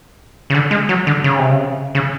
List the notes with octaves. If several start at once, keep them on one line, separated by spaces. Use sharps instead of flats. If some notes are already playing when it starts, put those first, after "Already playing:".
C#3
D3
G#3
F#3
D3
C#3
C3
C#3
C#3